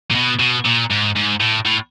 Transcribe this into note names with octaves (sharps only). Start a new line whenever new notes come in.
A#2
B2
B2
A#2
G#2
G#2
A2
A2